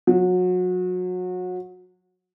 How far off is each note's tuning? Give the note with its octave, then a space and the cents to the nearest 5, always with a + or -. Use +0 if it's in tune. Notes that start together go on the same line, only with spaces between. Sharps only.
F#3 -30